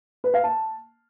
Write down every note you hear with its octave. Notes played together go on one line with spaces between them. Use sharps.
B4
F5
A5